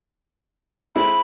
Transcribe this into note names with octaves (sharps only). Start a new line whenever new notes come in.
G#3 C4 E4 B5